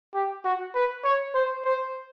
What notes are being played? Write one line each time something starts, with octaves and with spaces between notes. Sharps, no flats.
G4
F#4
B4
C#5
C5
C5